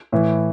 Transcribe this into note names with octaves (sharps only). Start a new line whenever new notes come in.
A2 E3